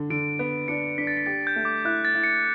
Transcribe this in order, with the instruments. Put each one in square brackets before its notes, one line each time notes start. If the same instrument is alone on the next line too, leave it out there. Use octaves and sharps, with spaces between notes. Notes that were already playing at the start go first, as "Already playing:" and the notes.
Already playing: [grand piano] D3 D4
[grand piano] D3 [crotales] D7
[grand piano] B3
[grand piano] D4 [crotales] C#7
[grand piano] D4 [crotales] B6
[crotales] A6
B6
[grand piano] G4 [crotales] A6
[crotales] G6
[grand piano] A3
[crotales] D6
[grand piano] E4 [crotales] F#6
[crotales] A6
[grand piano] E4
[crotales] C#7